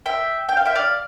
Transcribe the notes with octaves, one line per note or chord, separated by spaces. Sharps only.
E5 G5
G5
F5
E5 G5
D5 F5